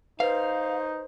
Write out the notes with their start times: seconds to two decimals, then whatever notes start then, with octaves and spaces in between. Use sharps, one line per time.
0.20 D#4 B4 C5 F5